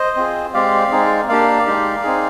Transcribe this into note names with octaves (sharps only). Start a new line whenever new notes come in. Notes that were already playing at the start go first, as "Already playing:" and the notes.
Already playing: C5 D#5
C4 F4 G#4
G#3 C4 G4 D5 F5
G#3 C4 D#4 G#4
A#3 D4 G4 D5 F5
G#3 D#4 G4
C4 D#4 G#4